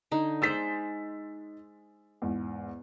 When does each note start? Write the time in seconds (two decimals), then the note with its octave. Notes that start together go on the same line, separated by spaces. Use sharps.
0.12 D3 D#4
0.42 G#3 C5 E6 A6 B6
2.22 E2 G#2